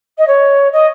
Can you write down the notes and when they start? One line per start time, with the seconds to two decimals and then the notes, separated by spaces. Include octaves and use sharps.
0.18 D#5
0.27 C#5
0.72 D#5